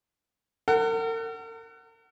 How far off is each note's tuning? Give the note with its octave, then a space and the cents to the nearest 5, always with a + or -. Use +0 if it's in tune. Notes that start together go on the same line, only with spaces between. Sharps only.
A#4 -45 F#5 +20